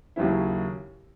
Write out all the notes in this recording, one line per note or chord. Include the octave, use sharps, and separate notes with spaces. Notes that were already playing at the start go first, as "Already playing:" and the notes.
D#2 C#3 F#3 C#4 E4